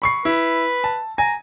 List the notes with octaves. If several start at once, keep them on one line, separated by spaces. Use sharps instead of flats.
B5 C#6 C7
E4 B4
A5
G#5 A#5